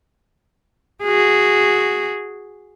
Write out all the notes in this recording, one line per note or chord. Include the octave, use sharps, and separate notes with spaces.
F#4 G#4